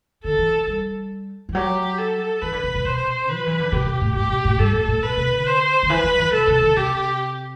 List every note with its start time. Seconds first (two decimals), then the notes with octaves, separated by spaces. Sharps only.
0.24 D3 A4
0.38 E3
0.68 G3
1.49 E3
1.55 F#3 G4
1.98 A4
2.42 E3 B4
2.52 D3
2.63 C3
2.75 B2
2.85 B2 C5
3.29 B4
3.34 F#3
3.47 E3
3.60 D3
3.72 C3 G4
3.87 B2
4.01 A2
4.16 A2 G4
4.30 B2
4.45 A2
4.59 G2 A4
4.74 A2
4.88 A2
5.03 B2 B4
5.17 C3
5.32 D3
5.46 C5
5.83 D3
5.90 E3 B4
6.04 F#3
6.18 E3
6.33 C3 A4
6.48 C3
6.62 D3
6.77 C3 G4